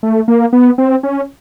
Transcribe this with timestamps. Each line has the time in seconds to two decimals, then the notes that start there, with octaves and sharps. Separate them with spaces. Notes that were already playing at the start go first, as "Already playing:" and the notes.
0.03 A3
0.28 A#3
0.53 B3
0.78 C4
1.03 C#4